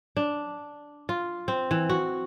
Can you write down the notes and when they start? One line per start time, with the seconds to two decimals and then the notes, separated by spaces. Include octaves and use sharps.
0.17 D4
1.09 F4
1.48 C4
1.71 E3
1.89 F#4